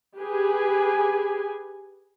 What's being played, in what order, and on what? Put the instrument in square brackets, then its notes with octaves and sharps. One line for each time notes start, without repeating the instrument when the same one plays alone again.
[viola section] G4 G#4 B4 G#5